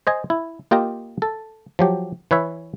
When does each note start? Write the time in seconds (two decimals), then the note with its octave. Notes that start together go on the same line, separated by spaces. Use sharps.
0.07 C5 D#5 G#5
0.30 E4
0.71 A#3 F4 G4 D#5 G5 A#5
1.22 A4
1.79 F3 F#3 G4
2.31 E3 B4 C#5 E5